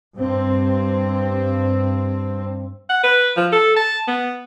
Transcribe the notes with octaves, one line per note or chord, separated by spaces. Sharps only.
G2 C4
F#5
B4
F3
A4
A5
B3